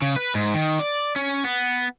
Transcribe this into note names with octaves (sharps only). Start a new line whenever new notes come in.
C#3
B4
G#2
D#3
D5
C#4
B3